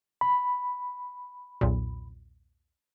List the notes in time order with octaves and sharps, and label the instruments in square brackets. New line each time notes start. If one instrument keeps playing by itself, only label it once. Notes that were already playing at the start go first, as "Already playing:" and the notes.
[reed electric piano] B5
[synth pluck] B1 E2 A#2